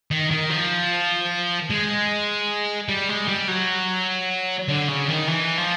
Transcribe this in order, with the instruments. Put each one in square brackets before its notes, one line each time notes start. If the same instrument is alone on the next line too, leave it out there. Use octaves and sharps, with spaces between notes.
[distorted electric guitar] D#3
D#3
F3
G#3
G3
G#3
G3
F#3
D3
C#3
D#3
E3
F3